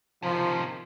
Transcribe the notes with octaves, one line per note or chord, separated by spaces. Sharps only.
C3 D#3 F3